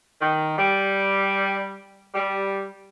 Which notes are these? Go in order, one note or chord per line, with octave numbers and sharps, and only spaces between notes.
D#3
G3
G3